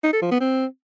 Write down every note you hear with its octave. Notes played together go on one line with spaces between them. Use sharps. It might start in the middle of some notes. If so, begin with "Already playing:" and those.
D#4
A4
F3
B3
C4